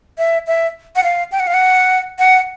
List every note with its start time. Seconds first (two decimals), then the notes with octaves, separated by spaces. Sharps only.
0.18 E5
0.47 E5
0.96 F#5
1.04 F5
1.32 G5
1.40 F#5
1.47 F5
1.54 F#5
2.19 F#5